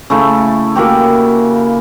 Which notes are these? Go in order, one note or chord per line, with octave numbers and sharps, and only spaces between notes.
C#3 A3 E4
A#3 E4 F#4 G4